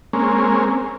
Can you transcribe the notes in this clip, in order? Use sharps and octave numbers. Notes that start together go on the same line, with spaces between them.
G#3 A#3 C4 C#4